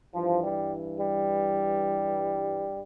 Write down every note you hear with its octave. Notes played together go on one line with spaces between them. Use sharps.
G2 E3 F3
G3
G3